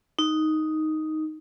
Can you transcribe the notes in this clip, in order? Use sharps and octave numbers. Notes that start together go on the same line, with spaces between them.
D#4